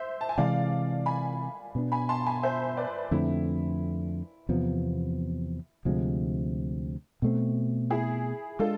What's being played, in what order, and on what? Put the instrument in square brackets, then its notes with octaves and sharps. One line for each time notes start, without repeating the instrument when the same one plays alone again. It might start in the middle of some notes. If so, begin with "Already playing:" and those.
Already playing: [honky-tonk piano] C5 E5
A5
G#5
[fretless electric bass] C3 E3 G#3 [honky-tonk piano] D5 F5
[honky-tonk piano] G#5 B5
[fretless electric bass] B2 B3 D4
[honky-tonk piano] G#5 B5
A5 C6
G#5 B5
C5 E5
B4 D5
[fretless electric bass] F2 D3 A3 C4 [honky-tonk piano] E4
[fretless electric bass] E2 C3 F3 B3
D2 C3 F3 G#3
B2 A3 C4
[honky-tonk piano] E4 G#4
[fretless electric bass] G#3 D4 [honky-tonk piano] F4 A4